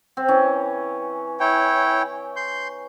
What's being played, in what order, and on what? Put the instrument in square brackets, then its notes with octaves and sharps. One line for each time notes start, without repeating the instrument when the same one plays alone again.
[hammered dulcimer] C4
E3 C#4
[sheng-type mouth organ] E4 C#5 G5
C6 G6